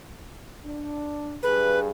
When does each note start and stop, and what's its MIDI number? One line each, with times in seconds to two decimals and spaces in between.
0.64 1.36 62
1.43 1.89 43
1.43 1.89 68
1.43 1.80 71